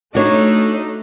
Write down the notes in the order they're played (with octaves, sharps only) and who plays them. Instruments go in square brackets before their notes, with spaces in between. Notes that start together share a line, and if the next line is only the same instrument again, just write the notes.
[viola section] A3 [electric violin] D4 [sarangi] D#4 [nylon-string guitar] F#4 C#5